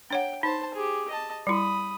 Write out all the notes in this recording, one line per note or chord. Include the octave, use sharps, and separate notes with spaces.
D4 C#5 F#5 G5
D#4 C5 A5
G4 G#4
D#5 A5
G3 E4 B5 D#6